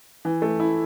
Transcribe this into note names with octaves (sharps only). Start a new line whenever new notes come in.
E3
A3
E4